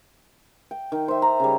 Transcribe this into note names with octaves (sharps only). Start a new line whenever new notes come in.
G5
D#3
C5 E5
A#5
C#3 G3